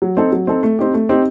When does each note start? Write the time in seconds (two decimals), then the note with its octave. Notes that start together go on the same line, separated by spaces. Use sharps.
0.02 F#3
0.17 C4 D#4 A4
0.32 F#3
0.47 C4 D#4 A4
0.63 A3
0.79 C4 D#4 G4
0.94 A3
1.09 C4 D#4 G4